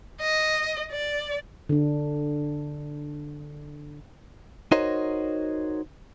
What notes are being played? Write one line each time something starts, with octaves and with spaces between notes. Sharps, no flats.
D#5
D5
D3 D4
D#4 F#4 A#4 C5 C#5 D#5